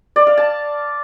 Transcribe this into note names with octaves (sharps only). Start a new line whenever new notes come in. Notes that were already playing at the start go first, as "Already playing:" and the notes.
D5
F5
A5